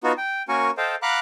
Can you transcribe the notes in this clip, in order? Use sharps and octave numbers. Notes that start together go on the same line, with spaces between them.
B3 D#4 F4 F#4
G5
A#3 C#4 F#4 A#4 G#5 C#6
A4 C5 D#5 F5 G5
F5 F#5 A#5 B5 D6 F#6